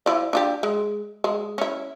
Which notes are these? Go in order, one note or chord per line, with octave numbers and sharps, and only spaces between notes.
F3 E4 D5
D4 F4 G4
G#3
G#3
C#4 E4